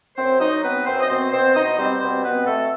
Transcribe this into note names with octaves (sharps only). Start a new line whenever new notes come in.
F#2 C4 C5
F#3 D#4 D#5
B3 C4 B4
F#2 C4 C5
D#5
B2 C4 C5
B2 C4 C5
B2 D#4 D#5
G3 C4 C5
B2 C4 C5
B3 C4 B4
B2 A3 A4